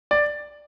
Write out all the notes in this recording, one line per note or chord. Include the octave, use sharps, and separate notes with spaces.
D5